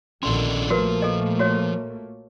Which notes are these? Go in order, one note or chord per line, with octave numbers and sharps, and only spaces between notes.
A#1 B2 D#3 C#4 D4 A4 C6
A#2 F3 A3 A#3 F#4 A#4 B4
A4 D#5
F#4 C#5